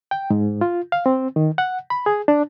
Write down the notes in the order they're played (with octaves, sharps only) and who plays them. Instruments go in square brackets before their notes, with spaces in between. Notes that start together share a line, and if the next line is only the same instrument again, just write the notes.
[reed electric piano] G5
G#2
F4
F5
C4
D#3
F#5
B5
G#4
D4